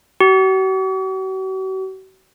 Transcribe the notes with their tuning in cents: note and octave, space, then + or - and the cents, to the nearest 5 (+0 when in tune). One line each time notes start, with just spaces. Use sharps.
F#4 +45